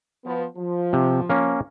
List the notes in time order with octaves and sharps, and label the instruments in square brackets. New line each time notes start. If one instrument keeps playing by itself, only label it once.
[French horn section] F3 B3
F3
[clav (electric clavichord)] C3
A#3 C#4